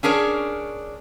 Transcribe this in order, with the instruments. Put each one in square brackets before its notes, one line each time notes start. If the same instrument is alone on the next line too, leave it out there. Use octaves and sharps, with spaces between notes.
[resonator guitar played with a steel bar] C#4 D4 G#4 A#4 C#5